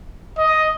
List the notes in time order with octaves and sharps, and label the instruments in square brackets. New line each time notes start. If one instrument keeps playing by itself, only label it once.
[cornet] D#5